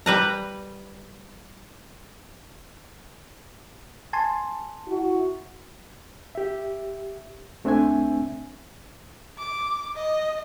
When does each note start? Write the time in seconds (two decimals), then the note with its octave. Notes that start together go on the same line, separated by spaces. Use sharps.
0.06 G3 B4 A#5
4.13 G#5 A5 C6
4.88 E4 F#4
6.35 G4 E5
7.64 C2 A3 C4 D4 E5 G#5
9.39 D6
9.96 D#5